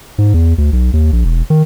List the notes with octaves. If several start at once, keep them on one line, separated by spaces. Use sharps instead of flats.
G#2
E2
D2
B1
D#2
A#1
E1
D#3